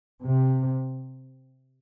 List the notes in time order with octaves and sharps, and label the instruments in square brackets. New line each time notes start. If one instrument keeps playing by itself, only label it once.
[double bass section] C3